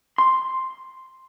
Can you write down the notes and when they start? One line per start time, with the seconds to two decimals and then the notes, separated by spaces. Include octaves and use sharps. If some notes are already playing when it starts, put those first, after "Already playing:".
0.18 C6